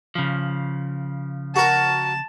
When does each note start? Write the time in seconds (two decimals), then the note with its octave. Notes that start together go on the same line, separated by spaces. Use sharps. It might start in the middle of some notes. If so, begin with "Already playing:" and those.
0.15 C#3 F3
1.56 F#4 A#4 A5